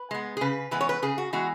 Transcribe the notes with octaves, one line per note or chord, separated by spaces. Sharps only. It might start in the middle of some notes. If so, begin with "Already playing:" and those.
Already playing: B4
G#3 B3
G#4
C#3 B4
E3 G#3 B3 B4
C#5
B4
C#3 G#4
F#4
E3 G#3 B3 F#4